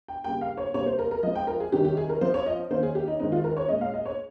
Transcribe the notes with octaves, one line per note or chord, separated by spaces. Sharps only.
G5
C#3 G3 A#3 G5
F5
C#5
C3 G3 A#3 C#5
C5
A#4
A#4
F3 G#3 C4 D#5
G5
A#4
G#4
C3 D#3 G3 C#4 G4
G4
G#4
A#4
F3 C4 C5
C#5
D#5
D#3 A#3 C#4 C5
G#4
G4
D#4
D#3 G#3 C4 D#4
F4
A#4
C#5
A#2 G#3 C#4 D#5
F5
D#5
C#5